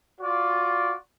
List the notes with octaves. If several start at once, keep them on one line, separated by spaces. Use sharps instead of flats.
F4 F#4 D5